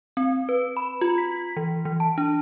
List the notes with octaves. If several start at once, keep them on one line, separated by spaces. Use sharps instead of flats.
C4
B4
B5
F4
B6
E3
E3
A5
D4